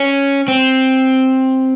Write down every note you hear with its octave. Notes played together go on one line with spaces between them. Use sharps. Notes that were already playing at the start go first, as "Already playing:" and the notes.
Already playing: C#4
C4